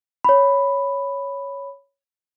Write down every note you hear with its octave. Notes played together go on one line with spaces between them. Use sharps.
C#5 B5